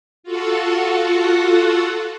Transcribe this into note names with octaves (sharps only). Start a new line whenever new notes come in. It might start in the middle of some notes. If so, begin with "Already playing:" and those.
F4 F#4 A4 F#5